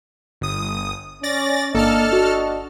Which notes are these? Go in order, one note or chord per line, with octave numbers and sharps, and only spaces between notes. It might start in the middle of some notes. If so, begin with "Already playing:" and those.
G1 D#6
C#4 D5 A6 A#6
G1 A#3 D4 A4 D#5 A5 F6
F#4